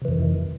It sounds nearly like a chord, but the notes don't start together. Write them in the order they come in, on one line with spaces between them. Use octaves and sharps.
C3 E3 F2 D#3